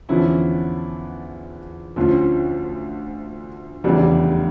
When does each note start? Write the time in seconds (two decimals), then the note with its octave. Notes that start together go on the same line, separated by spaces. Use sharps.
0.09 E2 D3 F3 C#4 E4
1.96 D2 D3 F3 C#4 F4
3.84 F1 E2 C#3 G3 D4